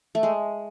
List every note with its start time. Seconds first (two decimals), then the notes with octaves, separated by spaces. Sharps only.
0.15 A3
0.23 G#3